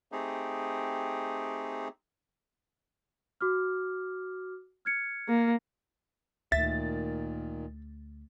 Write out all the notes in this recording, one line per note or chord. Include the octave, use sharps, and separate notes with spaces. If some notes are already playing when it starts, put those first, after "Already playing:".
A3 C4 D#4 G4 G#4
F#4 D6 F6
F6 G#6 C#7
A#3
D2 A#2 D#3 E5 A6